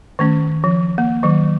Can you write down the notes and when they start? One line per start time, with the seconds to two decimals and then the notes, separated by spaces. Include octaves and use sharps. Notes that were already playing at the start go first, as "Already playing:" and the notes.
0.19 D#3 A3 C#4
0.64 F3
0.98 A#3
1.23 D#3 F#3